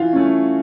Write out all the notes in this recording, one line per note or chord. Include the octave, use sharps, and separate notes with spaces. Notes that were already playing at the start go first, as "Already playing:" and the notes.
Already playing: E3 F4 F5
A3 C#4